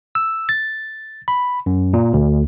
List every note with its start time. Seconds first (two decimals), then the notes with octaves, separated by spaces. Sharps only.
0.15 E6
0.49 A6
1.28 B5
1.66 F#2
1.93 A#2
2.13 D2